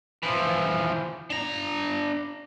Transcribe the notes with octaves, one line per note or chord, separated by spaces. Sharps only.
E3 F3
D4 A#5